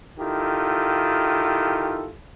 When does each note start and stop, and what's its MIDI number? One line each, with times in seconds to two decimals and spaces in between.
0.19 2.11 51
0.19 2.11 64
0.19 2.11 65
0.19 2.11 67
0.19 2.11 69